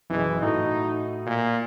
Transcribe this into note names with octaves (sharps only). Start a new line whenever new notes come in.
F#1 B2 E3 G#4
A2 D#4 F#4 A4
A#2